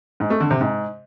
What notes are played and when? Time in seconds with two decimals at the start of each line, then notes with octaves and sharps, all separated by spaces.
0.20 G#2
0.30 A3
0.40 D3
0.51 C3
0.61 G#2